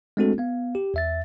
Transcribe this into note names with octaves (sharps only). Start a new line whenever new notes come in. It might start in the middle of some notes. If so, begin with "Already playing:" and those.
G#3 A3 C4 D4 F#4 A4
B3 F5
G4
E2 E5 A6